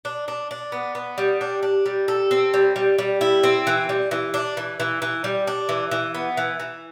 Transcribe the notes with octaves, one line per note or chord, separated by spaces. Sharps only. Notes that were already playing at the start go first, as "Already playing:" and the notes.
D4
D4
D4
B3
B3
G3
D4
D4
G3
A4
C4
G3
G3
G3
E4
C4
E3
G3
E3
D4
E3
E3
E3
G3
D4
E3
E3
B3
E3
E3